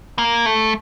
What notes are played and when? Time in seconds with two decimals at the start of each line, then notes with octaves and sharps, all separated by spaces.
0.19 A#3
0.46 A3